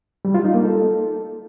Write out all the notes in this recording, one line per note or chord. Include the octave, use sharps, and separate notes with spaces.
G3
F4
D#4
A#3
A4